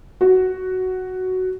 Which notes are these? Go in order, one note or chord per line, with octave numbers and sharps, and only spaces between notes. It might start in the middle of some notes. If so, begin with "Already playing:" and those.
F#4